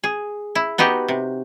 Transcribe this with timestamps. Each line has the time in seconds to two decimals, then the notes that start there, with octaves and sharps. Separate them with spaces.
0.04 G#4
0.55 E4
0.78 B3 D#4 F#4 G4
1.08 C3